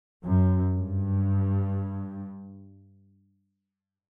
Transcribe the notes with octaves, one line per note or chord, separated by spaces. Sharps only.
F#2
G2